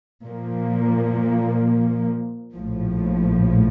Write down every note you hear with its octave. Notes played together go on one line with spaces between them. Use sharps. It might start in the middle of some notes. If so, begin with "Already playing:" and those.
A#2 F3 A#3
A#1 A2 F3